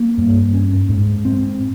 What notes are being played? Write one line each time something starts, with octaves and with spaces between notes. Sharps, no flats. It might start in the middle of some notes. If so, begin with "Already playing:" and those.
Already playing: A#3
G2
C#4
G#2
C4